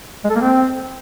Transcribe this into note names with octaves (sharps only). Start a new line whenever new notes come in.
G#3
A4
A#3
C4